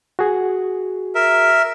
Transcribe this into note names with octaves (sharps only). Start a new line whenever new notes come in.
F#4 G#4
A#4 E5